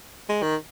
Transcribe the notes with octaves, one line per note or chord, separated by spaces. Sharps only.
G#3
D#3